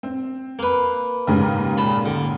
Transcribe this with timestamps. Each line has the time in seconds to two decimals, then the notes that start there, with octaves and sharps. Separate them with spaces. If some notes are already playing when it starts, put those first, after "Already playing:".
0.03 C4
0.59 A#3 B4
1.27 D#2 G#2 C#3
1.77 A#2 A5 B5
2.06 D3